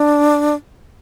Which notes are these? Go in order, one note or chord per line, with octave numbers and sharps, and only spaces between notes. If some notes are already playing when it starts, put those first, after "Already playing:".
Already playing: D4